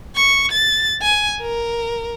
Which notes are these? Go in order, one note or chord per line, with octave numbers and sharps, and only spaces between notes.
C#6
A6
G#5
A#4